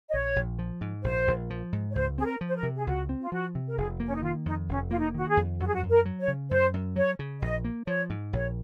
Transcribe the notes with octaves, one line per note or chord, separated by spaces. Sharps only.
D#5
A#1 C#5
A#1
F3
G#2
A#1 C5
A#1
F3
G#2
C#5
C#2 C5
C4 G#4
A#4
F3
C5
A#4
C3
G#4
C#2 F#4
C4
F4
F3 F#4
C3
A#4
F1 G#4
A#3
C#4
D#4
D#3 F4
F2 D#4
F1 C#4
A#3 F4
D#4
D#3 F#4
G#4
F2
F#2 F#4
G#4
F#4
F#2
A#4
F#3
C#5
C#3
F#2 C5
F#2
F#3 C#5
C#3
A#1 D#5
A#3
F3 C#5
G#2
A#1 C#5